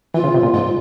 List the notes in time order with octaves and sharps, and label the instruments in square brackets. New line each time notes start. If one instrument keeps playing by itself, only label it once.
[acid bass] E3 [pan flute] F4
[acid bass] C#3
C3
A#2
[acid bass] G#2 [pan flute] F4